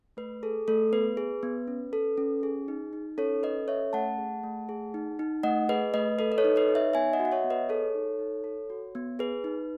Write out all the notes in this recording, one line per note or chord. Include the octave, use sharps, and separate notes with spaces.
A3 B4
G#4 A4
A3 A4
B3 B4
G#4
B3
C#4
A4
C#4
G#4
D#4
D#4
C#4 A4 C#5
A4 B4 D#5
C#4 C#5 E5
A3 F#5 A5
G#4
A3
G#4
D#4
D#4
A3 D#5 F#5
G#4 B4 D#5
A3 B4 D#5
A4 B4
D#5
A4 C#5
D#4
B4 D#5
D#4
C#5 E5
B3 E5 G#5
D#5 F#5
F#4
F#5
C#5 E5
B3
B4 D#5
G#4 A4 C#5
D#4
D#4
A4
F#4
B3
G#4 B4
D#4